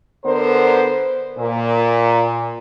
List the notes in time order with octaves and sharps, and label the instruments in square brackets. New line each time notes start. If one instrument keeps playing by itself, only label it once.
[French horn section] D3 B3 A#4 C5
A#2